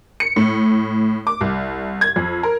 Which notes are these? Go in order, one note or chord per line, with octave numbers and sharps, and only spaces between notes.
C#7
A2
D6
C2
G#6
F2
A#4